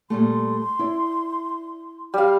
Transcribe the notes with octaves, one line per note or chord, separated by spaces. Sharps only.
A#2 G3 A3 C6
E4 D5
G3 F5 B5